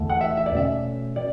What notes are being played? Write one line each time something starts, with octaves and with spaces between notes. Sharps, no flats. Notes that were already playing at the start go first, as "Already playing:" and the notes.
Already playing: E2 D3 A3
F#5
E5
E5
D5
B2 A3 C#4 E5
D5